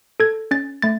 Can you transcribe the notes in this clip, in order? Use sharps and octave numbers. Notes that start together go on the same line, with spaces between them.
A4 G#6
C#4 A6
A3 A6